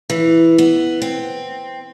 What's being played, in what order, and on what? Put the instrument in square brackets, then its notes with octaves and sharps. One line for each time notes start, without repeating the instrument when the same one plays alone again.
[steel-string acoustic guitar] E3
B3
C4